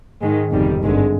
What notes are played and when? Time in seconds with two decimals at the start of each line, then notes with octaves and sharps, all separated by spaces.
0.22 G#2 D#3 G#3
0.52 G1 F2 C3 D#3 G3
0.81 G#1 G2 D3 G#3